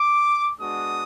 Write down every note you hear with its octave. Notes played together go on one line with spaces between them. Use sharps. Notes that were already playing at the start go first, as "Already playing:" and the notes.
Already playing: D6
G#3 B3 D4 F#4 D#6